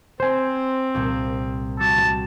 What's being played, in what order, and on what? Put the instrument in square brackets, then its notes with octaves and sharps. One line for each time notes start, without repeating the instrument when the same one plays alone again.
[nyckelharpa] C4 [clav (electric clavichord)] C5 G#5
[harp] C2 A#2 G3
[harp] G3 F#4 [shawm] A5